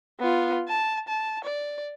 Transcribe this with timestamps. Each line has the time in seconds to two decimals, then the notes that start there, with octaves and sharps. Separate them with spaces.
0.20 B3 F4
0.69 A5
1.08 A5
1.45 D5